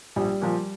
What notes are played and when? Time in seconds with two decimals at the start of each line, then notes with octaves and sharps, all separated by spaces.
0.16 A#1 G3
0.42 A#2 F3